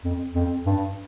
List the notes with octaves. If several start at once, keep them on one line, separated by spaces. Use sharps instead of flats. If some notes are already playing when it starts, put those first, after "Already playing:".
F2
F2
G2